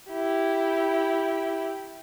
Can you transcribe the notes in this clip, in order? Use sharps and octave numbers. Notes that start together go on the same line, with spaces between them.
E4 G4